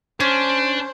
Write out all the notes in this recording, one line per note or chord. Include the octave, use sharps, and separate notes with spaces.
C#4 D4 C5